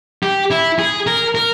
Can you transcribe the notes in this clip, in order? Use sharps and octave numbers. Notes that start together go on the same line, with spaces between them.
G4
E4
G#4
A#4
A#4